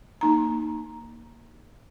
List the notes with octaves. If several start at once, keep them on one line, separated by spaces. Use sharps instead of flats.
A#3 D#4 A#5